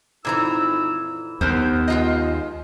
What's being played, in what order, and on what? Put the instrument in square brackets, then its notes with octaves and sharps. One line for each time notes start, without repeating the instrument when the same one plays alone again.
[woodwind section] F2 D#4 E6 [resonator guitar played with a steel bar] A#2 E3 A#5
[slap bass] D#2 [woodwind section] D#3 B3 [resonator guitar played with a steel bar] C5
[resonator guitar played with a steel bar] G#3 F4 D#5